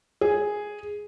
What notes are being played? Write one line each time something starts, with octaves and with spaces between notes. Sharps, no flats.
G#4